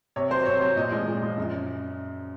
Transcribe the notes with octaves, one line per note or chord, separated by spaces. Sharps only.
C3 C#5
F#3 C4 C5
C3 C#5
F#3 C4 C#5
A#2 D#5
F3 G#3
A#2
F3 G#3
F#2